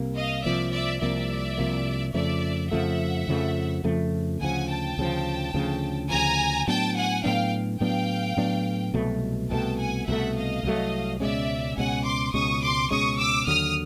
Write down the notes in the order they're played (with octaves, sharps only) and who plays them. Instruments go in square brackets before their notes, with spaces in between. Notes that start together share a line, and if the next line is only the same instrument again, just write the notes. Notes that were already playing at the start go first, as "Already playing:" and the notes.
Already playing: [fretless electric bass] C2 C3 A#3
[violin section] D#5 F5
[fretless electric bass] C2 C3 F3 A#3 [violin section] D5 E5
[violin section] D5 E5
[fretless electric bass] C2 C3 F3 A#3 [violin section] D5 E5
[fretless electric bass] C2 C3 F3 A#3
[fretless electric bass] F2 C#3 F3 A3 [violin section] D5 E5
[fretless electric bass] F2 C#3 F3 A3 [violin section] E5 F#5
[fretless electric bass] F2 C#3 F3 A3
F2 C#3 F3 A3
[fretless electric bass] D2 C#3 F3 [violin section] F#5 G#5
[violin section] G5 A5
[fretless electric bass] D2 C#3 F3
D2 C#3 F3
[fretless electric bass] D2 C#3 F3 [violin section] G#5 A#5
[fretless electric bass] A2 F#3 B3 D4 [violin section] G5 A5
[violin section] F#5 G#5
[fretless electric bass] A2 F#3 B3 D4 [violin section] F5 G5
[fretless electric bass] A2 F#3 B3 D4 [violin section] F5 G5
[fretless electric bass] A2 F#3 B3 D4
C2 B2 F#3 A3
[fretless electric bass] C2 B2 F#3 A3 [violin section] G5 A5
[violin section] F#5 G#5
[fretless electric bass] C2 B2 F#3 A3 [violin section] E5 F#5
[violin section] D#5 F5
[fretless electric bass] C2 B2 F#3 A3
[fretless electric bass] C#2 B2 G#3 C#4 [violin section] D5 E5
[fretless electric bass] C#2 B2 G#3 C#4 [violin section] F#5 G#5
[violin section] C6 D6
[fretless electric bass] C#2 B2 G#3 C#4 [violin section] C#6 D#6
[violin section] C6 D6
[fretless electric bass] C#2 B2 G#3 C#4 [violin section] C#6 D#6
[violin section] D6 E6
[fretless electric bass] D#2 D3 F#3 [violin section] D#6 F6